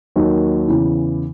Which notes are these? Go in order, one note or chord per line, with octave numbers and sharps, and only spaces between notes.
D#2 D#3 F#3 A#3
E2 C#3 E3